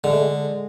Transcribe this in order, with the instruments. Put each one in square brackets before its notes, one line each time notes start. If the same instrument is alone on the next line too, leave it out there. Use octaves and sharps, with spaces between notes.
[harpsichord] D3 [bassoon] G#3
[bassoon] A3
G#3